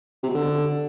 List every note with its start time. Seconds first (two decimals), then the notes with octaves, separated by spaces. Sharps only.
0.23 C3
0.29 B2
0.35 D3